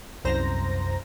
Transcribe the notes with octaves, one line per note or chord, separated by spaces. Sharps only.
C2 F#2 C5 A#5 A#6